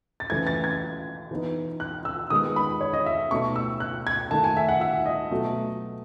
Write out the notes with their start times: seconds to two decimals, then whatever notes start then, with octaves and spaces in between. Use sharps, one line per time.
0.20 A6
0.30 C#3 E3 A3 E4 G#6
0.47 A6
0.64 G#6
1.31 E3 B3 D#4
1.80 F#6
2.05 E6
2.30 D#3 G#3 B3 D#6
2.56 B5
2.81 C#5
2.94 D#5
3.06 E5
3.31 B2 A3 D#4 C#6
3.56 E6
3.80 F#6
4.07 G#6
4.31 D#3 A3 D#4 A5
4.44 G#5
4.57 E5
4.68 F#5
4.81 E5
5.06 D#5
5.31 B2 F#3 A3